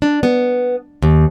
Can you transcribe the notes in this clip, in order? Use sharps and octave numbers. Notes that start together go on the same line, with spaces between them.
D4
B3
D#2